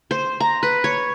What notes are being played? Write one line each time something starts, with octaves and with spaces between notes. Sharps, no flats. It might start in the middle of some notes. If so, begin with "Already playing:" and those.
C5
A#5
B4
C#5